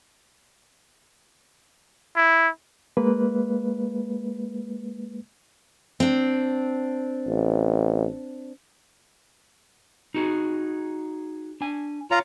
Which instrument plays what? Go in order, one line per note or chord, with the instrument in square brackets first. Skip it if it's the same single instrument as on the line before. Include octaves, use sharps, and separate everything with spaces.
[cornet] E4
[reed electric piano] G#3 A#3 B4
[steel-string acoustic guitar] C4 D4
[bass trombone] A1
[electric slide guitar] D#4 F#4 G#4
D4 G#5
[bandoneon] F4 A#5 [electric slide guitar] C#5 F5